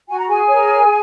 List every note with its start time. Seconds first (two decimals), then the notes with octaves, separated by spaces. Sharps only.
0.08 F#4 G#5
0.17 A#5
0.28 G#4 G#5
0.48 A#4 C#5